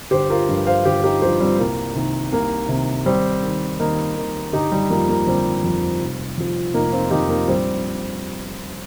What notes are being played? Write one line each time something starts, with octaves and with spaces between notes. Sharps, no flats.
G1 G4 C5
F4 A#4
G2 F3
C5 F5
G1 G4 C5
D#4 G4
G2 F3 G4 C5
G3 C4
C2 A#3
C3 D#3
C2 A#3
C3 D#3
D#2 G3 C4
D#3
D#2 A#3 D#4
D#3
G1 D#4 G4
G3
F2 F3 A#3
A#3
G1 G3 C4
F2 F3
F1
F2 F3
F1 A#3 D#4
C4 F4
F2 F3 D#4 G4
A#3
A#1 G3 C4